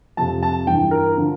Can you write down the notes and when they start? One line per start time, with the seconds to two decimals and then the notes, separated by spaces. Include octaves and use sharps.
0.17 F2 C3 F3 A5
0.43 A5
0.67 G2 E3 G5
0.91 A#4
1.17 D3 F3